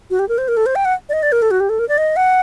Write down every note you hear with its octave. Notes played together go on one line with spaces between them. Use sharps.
F#4
G4
A#4
C5
A#4
A4
C5
G5
F#5
D5
D#5
D5
A#4
A4
F#4
G4
A4
A#4
D5
D#5
F#5